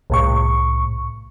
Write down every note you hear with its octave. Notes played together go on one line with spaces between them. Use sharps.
C2 A2 C#6